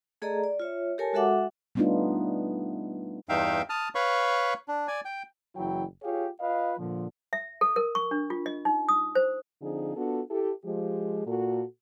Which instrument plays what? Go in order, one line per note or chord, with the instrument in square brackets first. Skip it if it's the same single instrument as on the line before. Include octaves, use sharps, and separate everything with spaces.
[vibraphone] A3 G#4 A4 D5 D#5 A#5
D5
F4 C#5 E5
G4 A4 A#4 C#5 G#5 A5
G#3 F#4 A4 E5 F#5 D6
[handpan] G3 A3 B3 D4 D#4 F4
[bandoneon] E2 G2 D#4 E5 F5 G5
A5 D#6 F6
B4 C#5 F5 B5 C#6
D4
D5 G#5
G5
[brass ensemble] F#1 E3 F#3 E4 G5
F4 G4 G#4 C#5 F5
F4 B4 D#5 F5
A#2 D3 F3
[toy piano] E5
A4
A#4
C#6
D4
F4
D#5
D#4
D#6
C5
[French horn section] D3 F3 C4 D#4 G#4
B3 D4 F4 F#4 A4
E4 G4 A4
F3 G#3 G4
A#2 F#4 A4